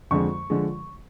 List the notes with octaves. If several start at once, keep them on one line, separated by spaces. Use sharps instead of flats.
F2 D3 F3 G#3 C#6
D3 F3 G#3